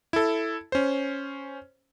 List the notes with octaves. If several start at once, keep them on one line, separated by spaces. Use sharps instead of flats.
E4 A4
C#4 C5